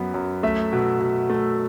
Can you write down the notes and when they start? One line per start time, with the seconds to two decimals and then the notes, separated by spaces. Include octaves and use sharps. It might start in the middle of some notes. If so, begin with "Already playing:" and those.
Already playing: F#2 F#3 B3
0.14 F#2
0.43 A3 E5
0.73 B2
1.00 B2
1.30 A3